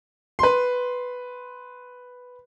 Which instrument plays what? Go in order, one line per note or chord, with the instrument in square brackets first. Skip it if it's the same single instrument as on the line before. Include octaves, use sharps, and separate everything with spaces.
[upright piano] B4 C6